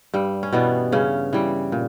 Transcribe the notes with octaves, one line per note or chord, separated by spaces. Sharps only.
G2 G3
C#4
B2 E3 G3 B3
G2 C#3 C#4
E3 G3
A#2